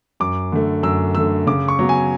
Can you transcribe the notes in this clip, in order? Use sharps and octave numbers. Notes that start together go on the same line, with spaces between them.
F#2 D6
D3 A3
F#2 E6
D3 A3 E6
C#3 D6
C#6
F#3 B3
G#5